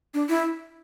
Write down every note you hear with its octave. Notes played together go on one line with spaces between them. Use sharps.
D4
E4